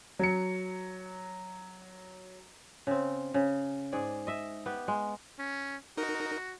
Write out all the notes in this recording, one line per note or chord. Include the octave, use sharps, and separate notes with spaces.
F#3 C#7
C#3 C4
C#3
G#2 G#4 D5
D#5 E5
B3 G4
G#3
C#4
D#4 F#4 A#4